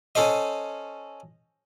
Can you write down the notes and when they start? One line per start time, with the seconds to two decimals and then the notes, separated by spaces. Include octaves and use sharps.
0.15 C#4 A4 C5 D#5